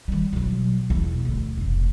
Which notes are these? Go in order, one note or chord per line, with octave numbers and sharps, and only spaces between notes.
D#3 G3
B2 F#3
E2 B2
D2 D3
F1 C3